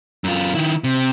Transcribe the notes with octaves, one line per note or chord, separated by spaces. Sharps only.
F#2 F4
D#3 E4
C3